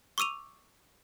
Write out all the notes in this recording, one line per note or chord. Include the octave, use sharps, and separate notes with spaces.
C#6 D6 E6 D#7 F7